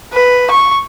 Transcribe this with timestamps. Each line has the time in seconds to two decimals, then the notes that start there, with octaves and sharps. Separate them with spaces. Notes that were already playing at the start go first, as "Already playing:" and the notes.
0.13 B4
0.51 C#6